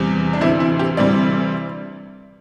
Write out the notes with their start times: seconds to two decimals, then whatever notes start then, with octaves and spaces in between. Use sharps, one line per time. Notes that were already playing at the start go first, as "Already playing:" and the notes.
Already playing: E2 C3 G3
0.33 D4
0.41 D2 C3 E3 E4
0.60 E4
0.79 G4
0.97 D2 C3 E3 G3 D5